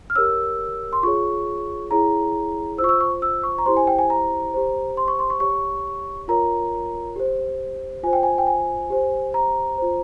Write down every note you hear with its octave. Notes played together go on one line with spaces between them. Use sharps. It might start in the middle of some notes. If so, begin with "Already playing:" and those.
F6
G4 A#4 C#5 E6
C6
F4 G#4 C#5 C#6
E4 G#4 C#5 A#5
F4 C5 C#6 E6
E6
C#6
E6
C#6
A#5
E4 G4 C5 C6
G#5
G5
G#5
A#5
G4 C5
C6
C#6
C6
C#6
G4 C#5 C#6
F4 A#4 C#5 A#5
G4 C5
F4 C5 G#5
G5
G#5
G5
G#5
G4 C5
A#5
F4 C5